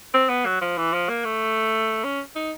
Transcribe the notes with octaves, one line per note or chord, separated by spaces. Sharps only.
C4
B3
F#3
F3
E3
F3
A#3
A3
C#4
D#4